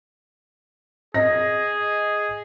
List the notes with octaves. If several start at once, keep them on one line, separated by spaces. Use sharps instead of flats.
G#4 D#5 A#6